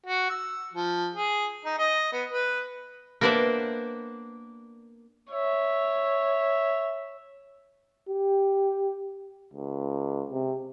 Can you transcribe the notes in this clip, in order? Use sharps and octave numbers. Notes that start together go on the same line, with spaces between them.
F#4
E6
F3
G#4
D#4
D#5
B3
B4
A#3 B3 D4 C5 D5 E5
C#5 E5
G4
C#2
C3